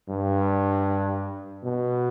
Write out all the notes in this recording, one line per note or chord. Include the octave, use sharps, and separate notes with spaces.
G2
B2